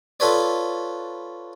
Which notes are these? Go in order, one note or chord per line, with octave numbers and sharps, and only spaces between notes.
F4 A4 B4 C#5 D5